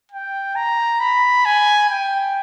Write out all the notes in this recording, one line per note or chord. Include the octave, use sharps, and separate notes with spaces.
G5
A#5
B5
G#5
G5